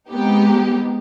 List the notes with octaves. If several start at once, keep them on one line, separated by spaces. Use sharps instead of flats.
G#3 B3 C4 D#4 G4